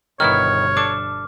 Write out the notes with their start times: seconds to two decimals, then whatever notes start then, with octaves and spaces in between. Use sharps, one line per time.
0.20 G1 B2 D#3 B3 E4 C#5 F6
0.77 D4 A4 D6